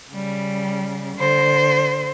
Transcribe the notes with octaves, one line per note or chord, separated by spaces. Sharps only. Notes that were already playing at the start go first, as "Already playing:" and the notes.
C#3 G3
D3 C5